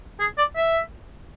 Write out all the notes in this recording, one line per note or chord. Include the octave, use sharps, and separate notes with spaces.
G#4
D5
E5